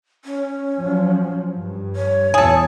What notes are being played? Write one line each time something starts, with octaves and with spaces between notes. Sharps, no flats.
C#4
F3 F#3
G2
C#5
E2 B2 G#4 A4